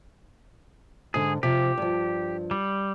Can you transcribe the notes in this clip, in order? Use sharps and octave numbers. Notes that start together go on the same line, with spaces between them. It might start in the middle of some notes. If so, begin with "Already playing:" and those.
G#2 D3 G#4
C3 F3 G4
G2 F3
G3